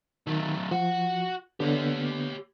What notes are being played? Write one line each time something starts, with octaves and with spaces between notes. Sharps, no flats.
D#3 F#3 A3
F3 F#4 F#5
D3 B3 G4 C#5